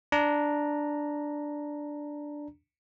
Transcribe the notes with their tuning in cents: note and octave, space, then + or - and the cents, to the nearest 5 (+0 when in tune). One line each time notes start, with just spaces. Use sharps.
D4 +0 A#5 +0